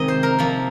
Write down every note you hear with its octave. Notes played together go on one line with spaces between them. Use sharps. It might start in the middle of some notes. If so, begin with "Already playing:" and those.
Already playing: C3 D#3 G#3 D#5
C5
A#4
C3 F3 A#3